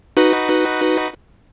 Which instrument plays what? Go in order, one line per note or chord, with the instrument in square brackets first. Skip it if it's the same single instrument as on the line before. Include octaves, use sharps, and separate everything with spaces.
[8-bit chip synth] D#4 F#4 B4